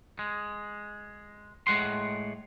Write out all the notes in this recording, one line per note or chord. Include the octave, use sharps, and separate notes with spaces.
G#3
A2 G#3 F#5 C6